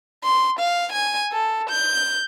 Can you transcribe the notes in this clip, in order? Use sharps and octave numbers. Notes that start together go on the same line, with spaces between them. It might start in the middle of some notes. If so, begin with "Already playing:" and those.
C6
F5
G#5
A4
G6